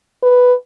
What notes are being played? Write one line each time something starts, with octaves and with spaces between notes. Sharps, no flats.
B4